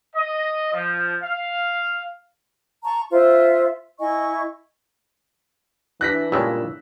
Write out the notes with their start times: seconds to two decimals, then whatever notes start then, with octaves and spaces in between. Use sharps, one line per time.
0.15 D#5
0.73 F3
1.23 F5
2.83 A5 A#5 C#6
3.10 F4 C5 E5
4.00 E4 D#5 G#5 C#6
6.01 E3 D4 E4 F#6 A#6 B6
6.32 G2 A#2 C#3 G#3 E6